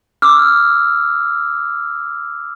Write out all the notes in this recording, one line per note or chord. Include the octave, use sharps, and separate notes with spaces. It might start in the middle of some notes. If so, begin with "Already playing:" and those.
D6 E6 F6